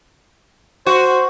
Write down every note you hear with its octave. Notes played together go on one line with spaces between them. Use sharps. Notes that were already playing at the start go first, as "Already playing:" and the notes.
F#4 C5